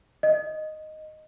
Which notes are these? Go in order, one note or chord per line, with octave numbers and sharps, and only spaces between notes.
D#5